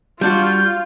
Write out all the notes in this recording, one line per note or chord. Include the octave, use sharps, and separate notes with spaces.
G3 D4 F4 F#4 G6